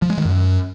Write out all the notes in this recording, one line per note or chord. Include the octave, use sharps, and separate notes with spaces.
F3
G#3
D#3
F#2